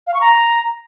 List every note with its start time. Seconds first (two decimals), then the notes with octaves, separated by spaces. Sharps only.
0.07 F5
0.14 C#6
0.21 A#5